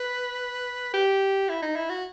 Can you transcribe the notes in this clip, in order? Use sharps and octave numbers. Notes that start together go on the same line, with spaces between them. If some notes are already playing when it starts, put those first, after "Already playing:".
Already playing: B4
G4
E4
D#4
E4
F#4